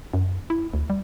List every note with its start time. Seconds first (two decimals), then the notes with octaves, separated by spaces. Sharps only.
0.13 F#2
0.50 E4
0.74 D2
0.90 G3